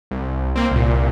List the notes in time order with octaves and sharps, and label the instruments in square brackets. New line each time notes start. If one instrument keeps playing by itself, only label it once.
[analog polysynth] C2
A#3 C4
C2 A#2